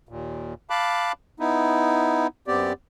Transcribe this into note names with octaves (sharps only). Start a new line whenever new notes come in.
D#2 A#2
F5 A5 B5 D6 F#6
B3 D#4 E4
F#2 B3 C4 G4 D5